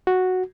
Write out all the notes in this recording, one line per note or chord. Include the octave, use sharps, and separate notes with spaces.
F#4